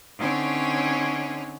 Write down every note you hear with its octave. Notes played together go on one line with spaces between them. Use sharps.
D3 C4 C#4 D#4 C#5